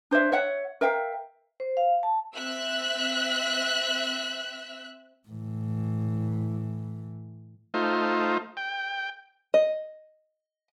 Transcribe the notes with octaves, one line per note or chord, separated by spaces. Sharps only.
D4 C5 D5 E5
C#5 E5 F#5
A#4 E5 F5 G5
C5
F5
A5
C4 E5 E6 F#6
A2 E3
A3 D#4 F4 C5
G5
D#5